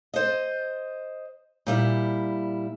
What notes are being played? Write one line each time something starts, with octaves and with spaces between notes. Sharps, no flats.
C5 D#5
A#2 G3 E4